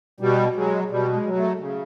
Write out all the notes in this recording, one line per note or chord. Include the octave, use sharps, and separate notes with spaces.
B2 G3
F#3 G#3
B2 G3
G#3
F#3
A3
C#3